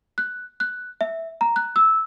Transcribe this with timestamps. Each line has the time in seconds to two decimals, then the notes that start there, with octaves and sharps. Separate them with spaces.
0.18 F#6
0.60 F#6
1.01 E5
1.41 A#5
1.56 F#6
1.76 E6